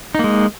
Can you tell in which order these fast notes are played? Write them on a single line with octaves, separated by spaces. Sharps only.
D#4 A#3 G#3